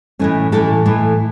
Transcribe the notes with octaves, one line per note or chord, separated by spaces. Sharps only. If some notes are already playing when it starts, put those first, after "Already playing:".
A2 E3 A3 C#4
A2 E3 A3 A4
A2 E3 A3